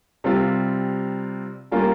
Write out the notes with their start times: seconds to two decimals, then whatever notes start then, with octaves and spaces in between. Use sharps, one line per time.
0.24 C3 G3 C4 F4
1.72 G3 A#3 C#4 F4